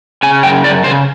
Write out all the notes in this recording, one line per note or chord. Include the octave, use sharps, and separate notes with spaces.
C#3 G#5
F#2 G5
F#2 D5
C#3 C5